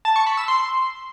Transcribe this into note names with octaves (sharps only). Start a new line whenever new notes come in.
A5
C#6
B5
E6
C6